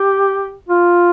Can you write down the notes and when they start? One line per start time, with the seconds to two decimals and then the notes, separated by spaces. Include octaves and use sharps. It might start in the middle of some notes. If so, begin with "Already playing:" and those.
Already playing: G4
0.69 F4